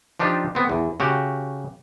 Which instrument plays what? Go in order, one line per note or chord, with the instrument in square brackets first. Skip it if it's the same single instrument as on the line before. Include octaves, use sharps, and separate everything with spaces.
[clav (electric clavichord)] F3 D4 D#4 F4 G4
B3 C4
E2
C#3 F#4 G4